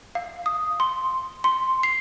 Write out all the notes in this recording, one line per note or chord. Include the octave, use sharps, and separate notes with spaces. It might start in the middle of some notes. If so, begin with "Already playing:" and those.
F5
D#6
C6
C6
C7